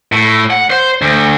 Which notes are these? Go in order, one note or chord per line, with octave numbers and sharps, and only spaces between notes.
A2
F#5
C5
D2